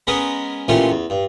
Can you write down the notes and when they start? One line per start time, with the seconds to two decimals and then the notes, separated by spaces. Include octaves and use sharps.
0.07 G#3 B3 C#4 G#4 A#4 B4
0.68 A#2 E3 A3 C#4 F4 G4
0.91 E2
1.10 G2